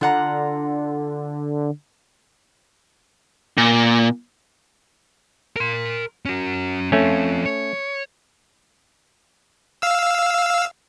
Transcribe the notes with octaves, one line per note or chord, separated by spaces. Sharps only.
D3 F4 F#5 A#5
A#2
A#4 C6
C#4 F#4
F3 A3 C4 C#4
C#5
F5 E6